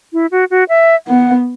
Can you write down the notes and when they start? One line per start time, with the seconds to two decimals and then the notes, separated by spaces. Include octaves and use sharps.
0.13 E4
0.31 F#4
0.50 F#4
0.69 E5
1.07 B3 F#5